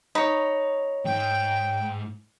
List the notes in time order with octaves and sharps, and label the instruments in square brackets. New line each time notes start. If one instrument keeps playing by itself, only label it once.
[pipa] D#4 [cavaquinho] C#5 B5
[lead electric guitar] E2 G#2 [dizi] G5